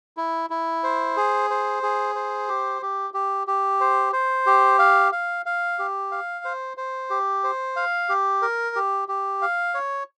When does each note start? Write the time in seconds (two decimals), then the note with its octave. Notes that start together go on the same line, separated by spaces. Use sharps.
0.17 E4
0.50 E4
0.83 C5
1.17 G#4
1.50 C5
1.83 G#4
2.15 C5
2.49 G4
2.82 G4
3.14 G4
3.47 G4
3.80 C5
4.13 C5
4.46 G4
4.79 F5
5.12 F5
5.46 F5
5.79 G4
6.12 F5
6.45 C5
6.77 C5
7.10 G4
7.44 C5
7.76 F5
8.09 G4
8.42 A#4
8.76 G4
9.08 G4
9.42 F5
9.74 C#5